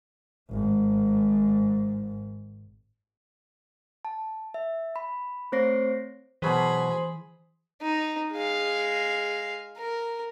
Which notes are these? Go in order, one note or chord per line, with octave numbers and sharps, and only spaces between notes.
G#1 G#2
A5
E5
B5
A3 C4 C5 C#5 A#6 C7
B2 E3 F#3 G#4 B4 C5 B5
D#4
G#3 F5
A#4